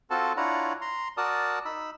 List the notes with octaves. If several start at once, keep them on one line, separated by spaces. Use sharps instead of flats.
C4 F4 F#4 A4 A5
D4 E4 F4 C#5 F#5 A#5
A#5 C6
F#4 A#4 D5 A5 D#6
D#4 B5 E6